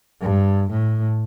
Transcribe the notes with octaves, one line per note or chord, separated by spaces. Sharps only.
G2
A2